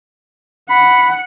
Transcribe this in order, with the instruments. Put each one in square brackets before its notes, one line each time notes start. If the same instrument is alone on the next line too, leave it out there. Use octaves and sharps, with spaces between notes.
[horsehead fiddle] F#5 [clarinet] B5